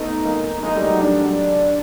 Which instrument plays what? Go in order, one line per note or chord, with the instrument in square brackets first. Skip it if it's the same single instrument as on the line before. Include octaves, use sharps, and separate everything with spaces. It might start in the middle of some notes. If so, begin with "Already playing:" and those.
Already playing: [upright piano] A3 B3 [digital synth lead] D#4
[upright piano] G#3 A#3
[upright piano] G#3 A#3 [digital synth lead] D#4
[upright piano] G3 A3
[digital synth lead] D#4
[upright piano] F#3
[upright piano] G3 [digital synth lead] D4
[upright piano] F#3